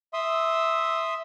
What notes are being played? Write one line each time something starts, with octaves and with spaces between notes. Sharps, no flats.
E5 C6 D#6 E6